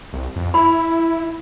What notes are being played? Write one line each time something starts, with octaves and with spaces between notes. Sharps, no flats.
C2
F2
E4 B5